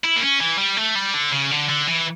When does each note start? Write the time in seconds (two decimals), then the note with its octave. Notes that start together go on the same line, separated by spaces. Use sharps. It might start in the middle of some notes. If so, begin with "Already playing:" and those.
0.04 E4
0.16 A#3
0.21 C#4
0.40 E3
0.58 G3
0.77 A3
0.95 G3
1.14 D3
1.32 C#3
1.51 D3
1.69 D3
1.88 E3